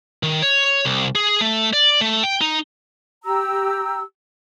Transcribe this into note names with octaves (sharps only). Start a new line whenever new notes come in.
D#3
C#5
C2
G#4
A3
D5
A3
G5
D#4
G4 A#5 E6